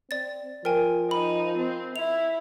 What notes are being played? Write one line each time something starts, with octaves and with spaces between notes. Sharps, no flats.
C4 D5 A6
F3 A#4 G5 G#5
D#4 B5
C4
E4 F7